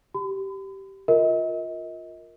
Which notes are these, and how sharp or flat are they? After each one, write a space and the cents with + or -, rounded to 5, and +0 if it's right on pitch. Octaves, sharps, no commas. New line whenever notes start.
G4 -15 B5 +40
F4 +15 A#4 +0 D#5 +35